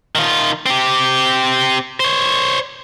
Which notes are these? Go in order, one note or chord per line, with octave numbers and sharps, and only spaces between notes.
D#3 F4
C4 G4
C5 C#5